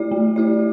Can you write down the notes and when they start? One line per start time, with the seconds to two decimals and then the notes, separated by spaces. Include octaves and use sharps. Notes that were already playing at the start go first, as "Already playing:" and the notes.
Already playing: A3 E4 G4 D5
0.11 A3
0.36 E4 G4 D5